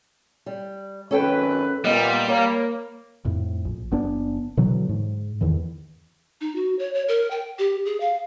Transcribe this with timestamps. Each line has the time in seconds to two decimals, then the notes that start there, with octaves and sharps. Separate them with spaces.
0.46 G3
1.11 G#1 F#2 C#4 A4 B4 G5
1.84 A#2 G3 B3 D#5
2.28 A#3 C#5
3.25 F2 A2
3.65 A#1
3.91 F#1 B3 D4
4.57 B2 D3 E3 F#3
4.89 G#2
5.41 E2 D#3 E3
6.41 D#4
6.55 F#4
6.79 C#5
6.94 C#5
7.08 A#4
7.31 G5
7.58 G4
7.85 G#4
8.00 F5